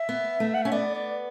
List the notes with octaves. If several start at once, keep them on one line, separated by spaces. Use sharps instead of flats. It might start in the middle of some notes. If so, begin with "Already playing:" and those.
Already playing: E5
B3
A3
F#5
C#4 E5
B3 D5
D5